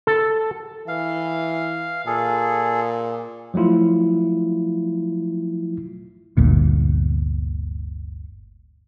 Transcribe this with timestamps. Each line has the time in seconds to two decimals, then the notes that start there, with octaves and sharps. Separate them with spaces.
0.07 A4
0.88 E3 F5
2.07 A#2 G#4 A4
3.54 F3 F#3 A3 E4 F4
6.37 G1 D2 A#2